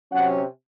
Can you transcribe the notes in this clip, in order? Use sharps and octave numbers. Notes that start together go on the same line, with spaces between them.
C3 F#3 C#4 F#5